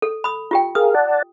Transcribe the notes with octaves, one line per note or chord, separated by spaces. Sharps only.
A4
B5 D#6
F4 G4 G5
G#4 A#4 F5 D#6
D5 F#5 A5